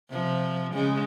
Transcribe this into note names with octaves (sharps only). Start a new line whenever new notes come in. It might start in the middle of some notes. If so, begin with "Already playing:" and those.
C3 F3
C#3 G#3